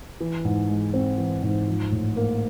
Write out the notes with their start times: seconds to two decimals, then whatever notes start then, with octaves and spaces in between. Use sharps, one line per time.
0.20 E3
0.45 G#2
0.69 G#3
0.93 C4
1.18 E3
1.43 G#2
1.67 F3
1.92 A2
2.17 A#3